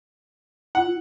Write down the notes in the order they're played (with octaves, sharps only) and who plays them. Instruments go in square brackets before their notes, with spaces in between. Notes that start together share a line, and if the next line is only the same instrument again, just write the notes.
[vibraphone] E4 F4 [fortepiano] F#5